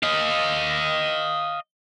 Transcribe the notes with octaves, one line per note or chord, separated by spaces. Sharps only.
D#5 F5